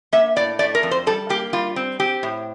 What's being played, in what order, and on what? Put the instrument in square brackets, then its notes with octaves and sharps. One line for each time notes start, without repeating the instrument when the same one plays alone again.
[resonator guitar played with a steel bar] A#3 E5
A2 D5
A3 D5
A#4
F2
C5
G3 A4
A#3 G4
G3 F4
C4
C4 G4
A2